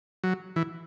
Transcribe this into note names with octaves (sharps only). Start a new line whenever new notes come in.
F#3
E3